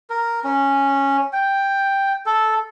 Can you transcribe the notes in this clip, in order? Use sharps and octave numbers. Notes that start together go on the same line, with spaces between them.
A#4
C#4
G5
A4